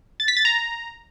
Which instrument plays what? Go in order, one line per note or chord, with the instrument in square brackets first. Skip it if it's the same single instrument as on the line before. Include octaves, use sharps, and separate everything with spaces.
[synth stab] A6
B6
A6
A#5